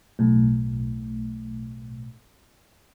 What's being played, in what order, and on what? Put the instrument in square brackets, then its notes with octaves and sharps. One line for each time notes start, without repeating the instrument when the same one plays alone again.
[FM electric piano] B1 A2